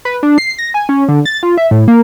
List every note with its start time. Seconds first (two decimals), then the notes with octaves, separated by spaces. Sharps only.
0.05 B4
0.23 D4
0.38 C7
0.58 A#6
0.74 G#5
0.89 C#4
1.09 D3
1.25 A6
1.43 F4
1.57 E5
1.71 A2
1.88 A#3